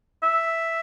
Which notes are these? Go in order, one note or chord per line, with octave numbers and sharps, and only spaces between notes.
E5